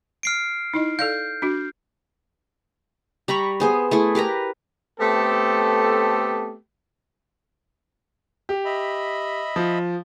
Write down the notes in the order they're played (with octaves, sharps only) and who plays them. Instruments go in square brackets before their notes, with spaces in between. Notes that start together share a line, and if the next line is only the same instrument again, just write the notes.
[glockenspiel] F6 C7 D7
[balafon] D#4 E4 D#5
[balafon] A4 D5 F5 [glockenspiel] G6
[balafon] D4 F#4
[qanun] G3 A#5 B5 C#6
B3 G#4 C5
A3 E4 G#4
G4 A#4 B4 A#5
[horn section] A3 B3 C4 G4 A4
[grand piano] G4
[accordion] D#5 E5 B5
[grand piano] F3